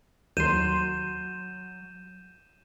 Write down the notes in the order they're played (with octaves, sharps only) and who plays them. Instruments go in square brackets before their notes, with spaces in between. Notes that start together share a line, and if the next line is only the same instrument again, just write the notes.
[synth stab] D#2 C6 [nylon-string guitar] F#3 [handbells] G6 [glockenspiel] D#7 E7